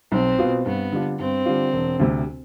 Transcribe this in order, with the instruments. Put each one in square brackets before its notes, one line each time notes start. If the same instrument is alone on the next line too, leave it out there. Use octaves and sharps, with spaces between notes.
[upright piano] B1 [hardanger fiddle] C4
[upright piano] B2 B3 F4
[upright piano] G2 [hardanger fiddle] B3
[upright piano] D3 G3 D4 F4
[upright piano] G2 [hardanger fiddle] C4
[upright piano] D3 G3 D4 F4
E1
D2 C3